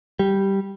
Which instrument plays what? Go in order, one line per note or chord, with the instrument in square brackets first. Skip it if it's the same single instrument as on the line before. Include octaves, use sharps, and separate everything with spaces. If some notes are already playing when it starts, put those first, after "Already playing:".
[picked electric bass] G3